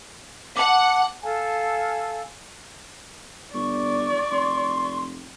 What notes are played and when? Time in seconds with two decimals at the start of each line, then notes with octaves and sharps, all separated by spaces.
0.57 F#5 A5 D6
1.22 A4 F5 G#5 A5
3.54 G1 D5 C#6
4.30 F1 C6